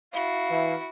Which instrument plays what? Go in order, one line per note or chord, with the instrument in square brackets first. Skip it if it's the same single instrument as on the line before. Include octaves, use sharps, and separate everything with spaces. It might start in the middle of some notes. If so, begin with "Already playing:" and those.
[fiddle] E4 F#4 [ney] F5
[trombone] E3